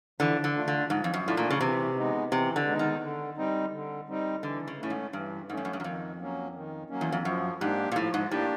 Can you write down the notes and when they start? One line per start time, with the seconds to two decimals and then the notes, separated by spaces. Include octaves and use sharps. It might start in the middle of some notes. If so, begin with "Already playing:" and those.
0.20 D3 E3 F3
0.44 D3
0.56 A3 D4 F4
0.68 D3
0.90 G#2 F3
1.04 F2
1.14 F#2
1.25 A2 A3 D4 F4
1.37 A#2
1.50 C#3
1.61 C3 E3
1.97 G#3 B3 D#4
2.32 C3 E3
2.56 D3
2.66 G#3 B3 D#4
2.79 D#3
3.02 D3
3.37 G3 C4 D#4
3.73 D3
4.08 G3 C4 D#4
4.43 D3 E3
4.68 C#3
4.79 A2 A3 C#4
4.90 G#2
5.13 G2 E3
5.49 G#2 A3
5.52 C#4
5.57 G2
5.65 F#2
5.73 G2
5.80 F#2
5.84 F2 D#3
6.20 F#3 A#3 C#4
6.55 D#3
6.90 F#3 A#3 C#4
7.01 E2
7.12 F2
7.25 F#2 F3
7.61 G#2 A#3 D4 G4
7.92 A#2
7.96 A2 F3
8.14 G#2
8.31 A2 A#3 D4 G4